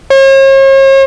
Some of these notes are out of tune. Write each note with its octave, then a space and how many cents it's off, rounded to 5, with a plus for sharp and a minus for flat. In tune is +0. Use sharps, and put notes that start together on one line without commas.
C#5 -45